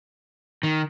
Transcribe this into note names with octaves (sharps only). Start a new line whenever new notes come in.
D#3